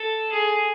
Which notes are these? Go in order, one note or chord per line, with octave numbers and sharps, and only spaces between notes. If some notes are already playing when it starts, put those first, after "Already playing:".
Already playing: A4
G#4